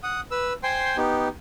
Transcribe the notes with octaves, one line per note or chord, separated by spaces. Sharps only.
F#5 D#6
B4 E6
C5 G5 G#5 C6
B3 D#4 G4